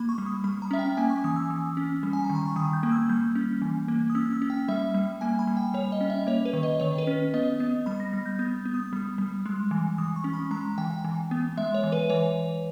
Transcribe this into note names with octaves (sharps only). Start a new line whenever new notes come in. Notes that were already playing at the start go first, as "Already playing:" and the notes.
Already playing: A#3 B5
C#6
G3
D#6
G3 B5
A#5
C#4 E5
G5
A#3 G#5
C#6
E3 D#6
E6
E3
C#4
G3
G#5
A#5
D#3
B5
C#6
D#3 D#6
G6
A#3
E6
G3 G6
C#4
E3
A#3
D#6
C#4 E6
E6
C#4
G5
G3 E5
G3
A#3 G#5
B5
G3
G5
G3 C#5
D#5
C#4
E5
A#3 C#5
B4
D#3
D#5
D#3 C#5
B4
C#4
B3 D#5
B3
G3 B5
A#6
G3 A#6
G6
B3 G6
B3
D#6
G3
G3
G#3
E3
E3 D#6
C#6
C#4
B5
G#3 A#5
E3 G5
G5
E3
B3
G#3 E5
C#5
E3
B4
E3 C#5